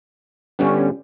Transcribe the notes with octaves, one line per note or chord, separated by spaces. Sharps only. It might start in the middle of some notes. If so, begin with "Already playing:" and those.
D3 G3 B3 C#4